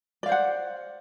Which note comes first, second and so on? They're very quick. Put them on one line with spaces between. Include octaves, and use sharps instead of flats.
D5 F5 C5 F#5